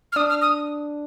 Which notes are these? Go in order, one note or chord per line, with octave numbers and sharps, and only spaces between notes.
F6
D4 D#6
F6
D#6